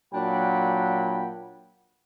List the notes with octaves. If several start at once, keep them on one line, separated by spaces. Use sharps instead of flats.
A#2 F#3 D4 F#5 G5 B5